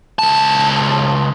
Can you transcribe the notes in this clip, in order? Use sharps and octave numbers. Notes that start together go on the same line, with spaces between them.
C#2 A5